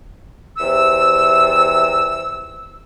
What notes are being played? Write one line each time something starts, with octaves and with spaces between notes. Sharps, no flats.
E2 C3 E6